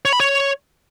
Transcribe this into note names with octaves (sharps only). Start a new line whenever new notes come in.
C#5
B5
C#5